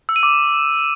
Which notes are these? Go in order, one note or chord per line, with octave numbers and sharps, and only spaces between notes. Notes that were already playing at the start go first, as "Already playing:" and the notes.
E6
D#7
D6